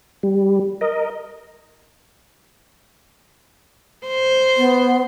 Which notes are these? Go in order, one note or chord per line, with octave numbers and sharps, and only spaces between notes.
G3
A#4 D#5
C5
B3